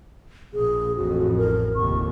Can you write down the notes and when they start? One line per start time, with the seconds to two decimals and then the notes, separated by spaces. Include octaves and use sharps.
0.53 A#1 G#4
0.96 A1 F2 F#4
1.36 A#4
1.76 F1 D#2 C#6